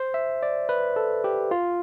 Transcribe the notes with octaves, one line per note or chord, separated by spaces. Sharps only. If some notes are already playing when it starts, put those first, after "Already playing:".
Already playing: C5
E5
D5
B4
A4
G4
F4